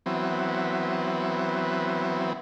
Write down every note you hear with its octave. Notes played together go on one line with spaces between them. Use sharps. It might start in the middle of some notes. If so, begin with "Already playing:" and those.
E3 F#3 B3 C4